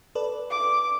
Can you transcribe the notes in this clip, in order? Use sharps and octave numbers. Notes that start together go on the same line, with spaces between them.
A4 B4 D5
D6